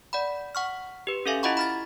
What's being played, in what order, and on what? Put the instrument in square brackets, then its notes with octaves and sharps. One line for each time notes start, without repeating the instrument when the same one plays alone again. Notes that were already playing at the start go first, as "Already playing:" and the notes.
[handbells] D5 F#5 B5
F#5 C#6 F6
G4 B4
C#4 G4 A4 E5 F5 G#5
E4 F4 D#5 F#5 B5 C#6
B5 F6 A6